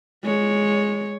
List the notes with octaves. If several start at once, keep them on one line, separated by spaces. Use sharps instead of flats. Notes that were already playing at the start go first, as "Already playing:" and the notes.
G#3 C#5